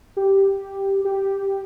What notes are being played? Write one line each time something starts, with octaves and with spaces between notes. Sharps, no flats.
G4
G4